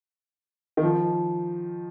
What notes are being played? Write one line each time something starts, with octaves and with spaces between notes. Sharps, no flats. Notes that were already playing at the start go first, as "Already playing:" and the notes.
D#3
F3